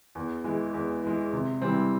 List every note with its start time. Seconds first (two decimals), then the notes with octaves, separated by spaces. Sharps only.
0.15 E2
0.44 E3 G#3
0.74 E2
1.04 E3 G#3
1.33 C3
1.61 E3 G3 C4